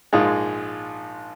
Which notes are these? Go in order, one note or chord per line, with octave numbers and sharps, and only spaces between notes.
A#1 G#2 G#3 F4